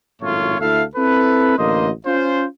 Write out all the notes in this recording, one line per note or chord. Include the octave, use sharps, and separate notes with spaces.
G#1 F#2 A2 A3 F4 C#5
D2 E4 A4 E5 F5
C4 E4 A4 B4
A1 D3 A#3 C5 D#5
C#4 F4 C5